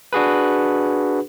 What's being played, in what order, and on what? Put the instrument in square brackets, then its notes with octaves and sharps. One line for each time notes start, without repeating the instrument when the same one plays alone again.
[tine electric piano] D4 F#4 G#4 B4